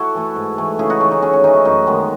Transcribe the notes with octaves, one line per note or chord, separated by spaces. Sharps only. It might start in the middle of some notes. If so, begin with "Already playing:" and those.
Already playing: E4 F#4 A4
E3 A3
G#2
E3 A3
C#3 E4 G#4
D#4 F#4
E3 A3
D#4
C#3 C#4
C#4
E3 A3 D#4
D#4
F#2 D#4
D#3 G#3 B3